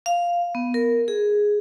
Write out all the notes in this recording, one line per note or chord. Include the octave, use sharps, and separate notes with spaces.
F5
B3
A#4
G#4